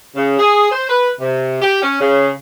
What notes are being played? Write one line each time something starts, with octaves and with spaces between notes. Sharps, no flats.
C#3
G#4
C5
B4
C3
G4
C#4
C#3